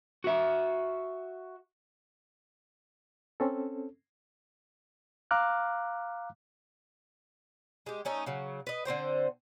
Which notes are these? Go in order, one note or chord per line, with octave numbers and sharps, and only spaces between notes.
F#4 E5
C4 C#4 A4
F5 A#5 D6 F6 F#6
G#3 G4
A3 C#4 D#4 A#4
C#3 F#3
B4 D#5
D3 C4 C5 G5